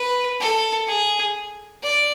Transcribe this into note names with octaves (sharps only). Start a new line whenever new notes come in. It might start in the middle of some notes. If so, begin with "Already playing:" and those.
Already playing: B4
A4
G#4
D5